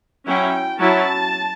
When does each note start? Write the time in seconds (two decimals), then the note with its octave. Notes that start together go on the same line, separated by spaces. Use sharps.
0.27 F#3 C#4 E4 G5
0.79 F#3 C#4 E4 A5